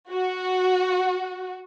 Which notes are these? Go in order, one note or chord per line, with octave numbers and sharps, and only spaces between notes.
F#4